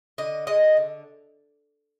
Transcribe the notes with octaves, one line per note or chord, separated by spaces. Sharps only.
D3 D#5
G#3 D#5
D3